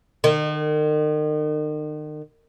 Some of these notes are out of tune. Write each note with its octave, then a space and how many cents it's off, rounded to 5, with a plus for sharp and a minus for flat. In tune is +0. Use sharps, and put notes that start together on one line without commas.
D#3 -40